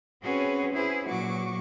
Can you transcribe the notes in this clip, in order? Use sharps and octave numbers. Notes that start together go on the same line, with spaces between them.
C4 C#4 F#4 G#4 B4 C#5
E4 G#4 B4 C5
A#2 F#3 F#4 C#6 D6